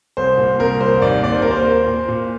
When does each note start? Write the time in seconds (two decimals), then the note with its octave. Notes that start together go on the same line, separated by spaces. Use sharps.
0.17 C2 C5
0.38 A#2
0.59 C2 A#4
0.80 C2 C5
1.02 D#2 D5
1.24 D#2 D5
1.33 C5
1.42 A#3 A#4
1.51 C5
1.66 A#3
1.87 A#2
2.08 A#2